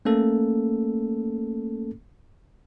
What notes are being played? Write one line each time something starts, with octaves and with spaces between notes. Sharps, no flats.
A3 A#3 C#4 A4